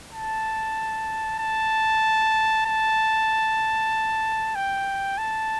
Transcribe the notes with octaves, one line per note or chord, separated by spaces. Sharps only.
A5
A5
A5
G5
A5